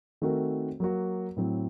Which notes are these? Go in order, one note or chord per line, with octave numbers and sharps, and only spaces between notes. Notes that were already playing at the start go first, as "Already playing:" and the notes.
D#3 A3 C4 F#4 A#4
F#3 A#3 F#4
A2 F#3 C4